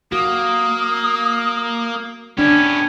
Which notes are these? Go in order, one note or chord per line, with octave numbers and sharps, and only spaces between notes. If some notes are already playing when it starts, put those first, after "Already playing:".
A#3 F#4 D#6
B3 C#4 D4 G4